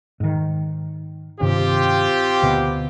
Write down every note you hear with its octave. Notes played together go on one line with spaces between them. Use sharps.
G#2 D#3
G2 C3 D#3 C4 F4 G4
D2 B2